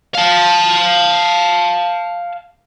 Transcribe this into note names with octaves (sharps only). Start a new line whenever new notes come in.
F5 A5